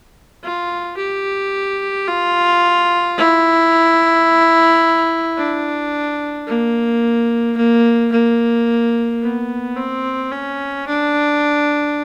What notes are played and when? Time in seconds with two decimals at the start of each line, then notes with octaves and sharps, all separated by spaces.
0.43 F4
0.97 G4
2.08 F4
3.18 E4
5.37 D4
6.47 A#3
7.57 A#3
8.12 A#3
9.22 B3
9.77 C4
10.32 C#4
10.87 D4